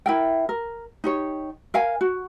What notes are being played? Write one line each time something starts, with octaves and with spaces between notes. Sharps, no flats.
E4 A#4 G5
A#4
D#4 G4 C#5
A#4 F5 G#5
F#4